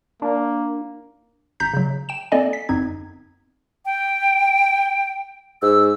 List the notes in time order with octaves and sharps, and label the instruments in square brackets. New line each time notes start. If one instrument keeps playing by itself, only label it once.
[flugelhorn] A#3 [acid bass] D4
[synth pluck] G#1 A#5 G6 B6
C#3 F#3
G5 E7
A#3 C4 A4 D5 D#5 G#5
B6
G1 F#2 B3 C4 D#4 G#6
[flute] G5
[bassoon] G#2 [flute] E6